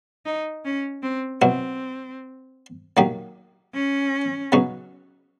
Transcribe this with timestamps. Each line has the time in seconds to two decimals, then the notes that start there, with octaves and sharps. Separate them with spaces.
0.25 D#4
0.65 C#4
1.02 C4
1.42 B2 F#3 B3 C4 E4
2.97 D#3 F#3 A#3 D#4 G4
3.74 C#4
4.52 C#3 F#3 B3 D#4 F#4